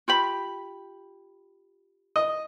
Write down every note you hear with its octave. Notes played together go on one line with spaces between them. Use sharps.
F4 G4 B5
D#5